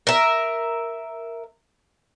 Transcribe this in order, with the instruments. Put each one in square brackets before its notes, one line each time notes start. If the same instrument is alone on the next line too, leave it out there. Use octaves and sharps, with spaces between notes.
[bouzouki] A#4 E5